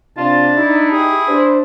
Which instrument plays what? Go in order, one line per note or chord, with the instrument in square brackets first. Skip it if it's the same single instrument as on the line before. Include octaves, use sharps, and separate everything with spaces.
[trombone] C3 [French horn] D4 [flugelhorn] F4 [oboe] A5
[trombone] D#4 [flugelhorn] E4
[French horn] G4 [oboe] G#4
[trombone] D4 [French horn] C5